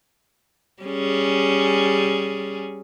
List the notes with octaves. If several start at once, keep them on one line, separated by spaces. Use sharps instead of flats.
G3 C#4 G#4